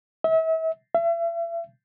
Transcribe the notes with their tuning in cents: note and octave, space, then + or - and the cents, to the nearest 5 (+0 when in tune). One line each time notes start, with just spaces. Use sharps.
E5 -35
E5 +40